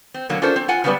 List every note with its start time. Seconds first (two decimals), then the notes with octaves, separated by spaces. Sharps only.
0.14 C4
0.29 B2 D3 F#3 A#3
0.42 C#4 D4 F4 A4 A#4 C5
0.56 C4
0.68 F4 F#5 G#5
0.84 C#3 F#3 G3 B3 B4 D5